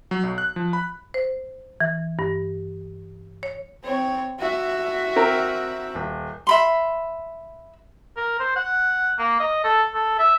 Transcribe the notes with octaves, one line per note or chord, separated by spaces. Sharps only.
F#3
B1
F#6
F3
B5
C5
E3
G2
C#5
C4 C#5
F#4 E5
C4 A#4 A#5
D#1
E5 B5 C6
A#4
C5
F#5
A#3
D#5
A4
A4
E5